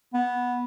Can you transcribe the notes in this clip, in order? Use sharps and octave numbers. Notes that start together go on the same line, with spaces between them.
B3